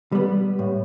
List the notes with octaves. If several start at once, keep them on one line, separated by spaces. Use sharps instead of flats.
G3 B3
A2